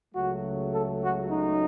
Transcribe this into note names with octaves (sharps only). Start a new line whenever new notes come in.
C#2 C#3 F#3 A3 F#4
A4
F#4
D#4